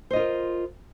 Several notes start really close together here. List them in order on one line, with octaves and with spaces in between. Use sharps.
C5 D#5 F4 A#4